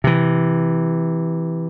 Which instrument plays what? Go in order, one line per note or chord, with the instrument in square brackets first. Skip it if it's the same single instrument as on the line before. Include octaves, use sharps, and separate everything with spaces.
[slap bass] C3 E3